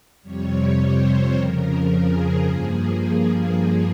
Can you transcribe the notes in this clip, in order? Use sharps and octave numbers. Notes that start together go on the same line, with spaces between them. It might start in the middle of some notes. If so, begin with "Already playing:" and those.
F2 C3 G3 C#5
C5
F2 C#3 F3 A#4
G#4
G2 F3 A#3